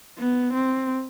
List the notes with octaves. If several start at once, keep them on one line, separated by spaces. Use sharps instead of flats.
B3
C4